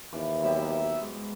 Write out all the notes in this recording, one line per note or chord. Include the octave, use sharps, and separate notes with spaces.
D#2 E3 D6
F#3 B3 G4 E5
G#2